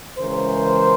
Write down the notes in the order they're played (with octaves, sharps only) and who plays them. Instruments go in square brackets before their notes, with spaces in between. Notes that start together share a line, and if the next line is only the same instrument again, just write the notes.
[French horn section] C#3 E3 G#3 A#4 C5